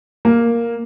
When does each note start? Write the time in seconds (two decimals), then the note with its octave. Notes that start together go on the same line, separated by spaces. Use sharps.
0.25 A#3